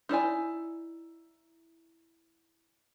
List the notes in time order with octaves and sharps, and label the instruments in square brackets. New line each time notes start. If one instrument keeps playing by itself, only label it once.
[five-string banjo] D#4 E4 D5 G#5